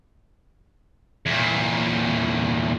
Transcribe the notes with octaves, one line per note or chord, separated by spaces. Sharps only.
E2 A#2